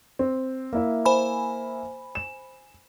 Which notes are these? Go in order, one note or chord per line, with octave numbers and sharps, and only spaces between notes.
C4
A#3 E4 E5
C5 G#5 B5
E7